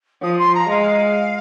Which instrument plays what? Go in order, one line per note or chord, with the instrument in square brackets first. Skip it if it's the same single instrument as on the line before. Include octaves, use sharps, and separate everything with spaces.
[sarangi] F3 [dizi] D#6
[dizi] C6
A#5
[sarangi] G#3 [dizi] F5